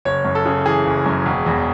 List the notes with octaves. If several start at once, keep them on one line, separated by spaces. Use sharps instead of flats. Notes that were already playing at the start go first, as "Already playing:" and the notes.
F#1 C#5
F#2
A4
C#3
E3 G#4
F#1
F#2
E1
E2